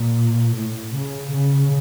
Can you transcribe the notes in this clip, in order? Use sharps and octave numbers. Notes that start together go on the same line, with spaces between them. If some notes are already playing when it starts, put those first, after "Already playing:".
Already playing: A#2
A2
C#3
C#3